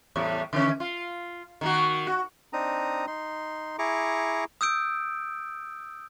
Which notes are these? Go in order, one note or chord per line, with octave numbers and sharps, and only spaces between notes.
E2 A2 G3
D3 E3 C#4
F4
D#3 A#3 F#4
F#4
C4 D4 D#4 A#5 D#6
D#4 C6
E4 G#4 A#5 C#6 D6
D#6 E6 G6 D7